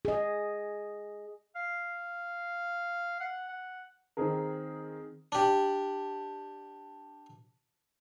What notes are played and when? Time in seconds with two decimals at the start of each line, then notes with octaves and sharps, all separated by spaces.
0.05 G#4 D#5
1.56 F5
3.20 F#5
3.48 F#5
4.17 D#3 C4 D#4 G#4 A#4
5.32 D4 G4